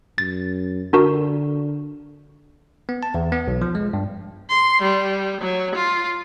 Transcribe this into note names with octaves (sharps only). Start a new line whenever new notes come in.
F#2 A6
D3 D4 F#4 A#4
B3
A5
E2
B3
B1
F3
G#3
G2
C6
G3
F#3
F4